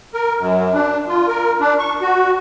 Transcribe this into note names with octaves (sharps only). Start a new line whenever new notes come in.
A#4
F#2
D4
F4
A#4
D4
C#6
F#4